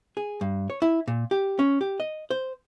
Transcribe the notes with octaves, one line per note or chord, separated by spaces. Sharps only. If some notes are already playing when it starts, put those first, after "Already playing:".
G#4
G2
C#5
E4
A#2
G4
C#4
G4
D#5
C5